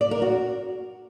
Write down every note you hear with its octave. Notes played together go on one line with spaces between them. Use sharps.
D5
A#4
F#4